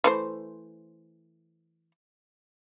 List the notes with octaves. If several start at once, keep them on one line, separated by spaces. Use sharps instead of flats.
E3 A3 C5